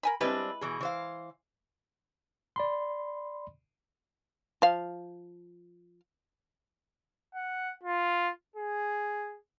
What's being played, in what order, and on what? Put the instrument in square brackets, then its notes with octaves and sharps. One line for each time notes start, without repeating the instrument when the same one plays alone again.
[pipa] A#4 G#5 B5
[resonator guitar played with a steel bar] G3 C4 D4 [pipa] G#3 E4 B4
[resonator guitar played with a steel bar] B2 E3 G#4
E3 C5 F5
[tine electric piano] D5 B5 C6
[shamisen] F3 F5
[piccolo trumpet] F#5
F4
G#4